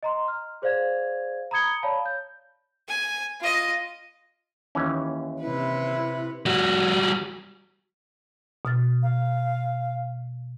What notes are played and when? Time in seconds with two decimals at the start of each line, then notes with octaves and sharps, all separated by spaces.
0.03 D#5 A#5 C6
0.28 F6
0.62 G#4 C5 D5 F5 G#6
1.51 A#5 B5 D#6 G#6 C#7 G7
1.83 C#5 D5 F5 A5 B5
2.06 G6
2.88 G#5
3.40 F4 D#5
4.75 D#2 E3 C#4
5.42 C3 E4 B4
6.46 G3 F#4
8.65 B2 F6 A6
9.03 F5